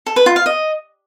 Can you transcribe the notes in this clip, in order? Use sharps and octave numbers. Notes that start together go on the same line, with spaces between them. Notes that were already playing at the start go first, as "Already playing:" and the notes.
A4
B4
F4
F5
D#5